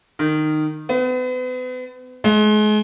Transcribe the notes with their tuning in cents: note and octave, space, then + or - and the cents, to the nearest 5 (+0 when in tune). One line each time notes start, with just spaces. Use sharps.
D#3 -15
B3 +40
G#3 +35